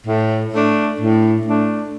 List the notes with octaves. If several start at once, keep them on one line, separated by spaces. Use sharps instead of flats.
A2
A3 D4
A2
A3 D4